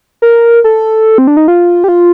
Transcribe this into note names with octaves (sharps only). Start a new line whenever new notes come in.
A#4
A4
C4
D4
D#4
F4
G4
F4